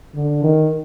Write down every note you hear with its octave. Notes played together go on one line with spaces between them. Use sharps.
D3
D#3